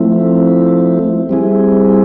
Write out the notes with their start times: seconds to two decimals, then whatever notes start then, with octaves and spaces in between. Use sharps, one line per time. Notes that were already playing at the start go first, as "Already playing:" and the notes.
Already playing: F3 A3 C4 E4
1.29 G3 C4 E4 G#4